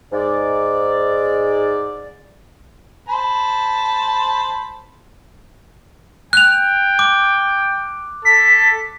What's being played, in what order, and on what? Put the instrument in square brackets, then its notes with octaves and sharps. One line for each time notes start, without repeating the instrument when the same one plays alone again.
[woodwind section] G#2 D5
[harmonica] C5 A5 B5
[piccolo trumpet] G5 [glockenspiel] F#6 F7
[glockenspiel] D6
[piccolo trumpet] A4 [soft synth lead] B6